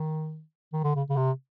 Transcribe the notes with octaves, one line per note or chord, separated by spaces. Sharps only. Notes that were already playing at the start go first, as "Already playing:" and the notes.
Already playing: D#3
D#3
D3
C#3
C#3
C3